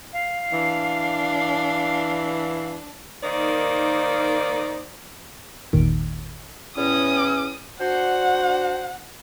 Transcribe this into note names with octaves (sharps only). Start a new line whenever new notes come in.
F5
E3 D4
D#3 A#3 D#4 C5 D5
G1 D#2 A#2 D#3 D7
E2 A2 C#4 D#6
D4 F#4 C5 F#5